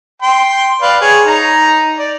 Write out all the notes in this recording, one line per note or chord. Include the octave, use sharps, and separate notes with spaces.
G5 C6
B4 D5 F5
G#4 C#5
D#4 A#5
D5